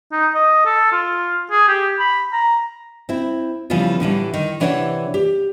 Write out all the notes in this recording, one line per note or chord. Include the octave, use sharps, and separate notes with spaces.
D#4
D#5
A4
F4
G#4
G4
B5
A#5
C4 E4
C#3 E3 F3 G3 B3 F4
A2 D3 E3 G3
D#3
C3 E3 D4 C#5 E5 F#5
G4